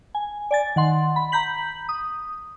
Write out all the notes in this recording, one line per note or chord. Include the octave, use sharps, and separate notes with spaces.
G#5
D5 G#5 A6
D#3 F#5 C6
B5
A#5 B5 G6 B6 F#7
D#6